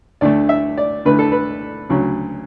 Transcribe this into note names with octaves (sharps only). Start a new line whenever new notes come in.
D2 D3 A3 D5
E5
D5
D2 D3 A3 B4
A4
B4
D2 C#3 F#3